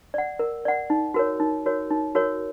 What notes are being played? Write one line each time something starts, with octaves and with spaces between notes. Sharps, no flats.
D5 F#5
A#4
D5 F#5
D#4
F#4 A#4 C#5
D#4
F#4 A#4 C#5
D#4
F#4 A#4 C#5